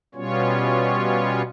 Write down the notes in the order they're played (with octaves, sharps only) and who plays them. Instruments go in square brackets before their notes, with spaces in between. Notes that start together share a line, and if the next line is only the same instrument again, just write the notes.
[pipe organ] B2 G3 B3 C#4 F4 C#5